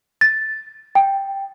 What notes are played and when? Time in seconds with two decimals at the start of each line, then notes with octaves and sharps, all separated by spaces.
0.21 A6
0.95 G5